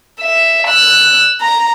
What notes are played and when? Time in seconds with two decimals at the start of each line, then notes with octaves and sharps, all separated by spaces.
0.21 E5
0.67 E6 F#6
1.41 A#5